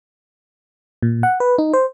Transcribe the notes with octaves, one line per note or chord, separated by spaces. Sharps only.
A#2
F#5
B4
D#4
C5